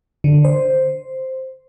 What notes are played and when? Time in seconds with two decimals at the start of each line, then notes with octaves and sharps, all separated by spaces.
0.24 D3
0.45 C5